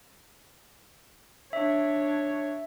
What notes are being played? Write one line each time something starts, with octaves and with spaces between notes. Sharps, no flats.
D4 C#5 E5